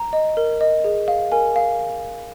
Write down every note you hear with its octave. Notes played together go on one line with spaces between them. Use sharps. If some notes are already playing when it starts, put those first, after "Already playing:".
Already playing: A#5
D#5
A#4
D#5
G#4
F5
A#4 G#5
F5